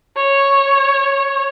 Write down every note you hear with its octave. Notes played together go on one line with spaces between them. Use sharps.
C#5